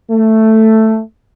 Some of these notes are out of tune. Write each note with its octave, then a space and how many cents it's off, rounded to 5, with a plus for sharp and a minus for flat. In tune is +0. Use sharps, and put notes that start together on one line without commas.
A3 +5